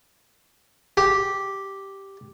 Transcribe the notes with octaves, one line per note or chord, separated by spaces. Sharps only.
G4